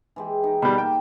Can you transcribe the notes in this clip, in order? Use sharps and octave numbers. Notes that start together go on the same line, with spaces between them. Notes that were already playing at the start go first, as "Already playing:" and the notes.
E3 G#3 G4
D#4 G5
B2 G3 A#3
G4 G5 A5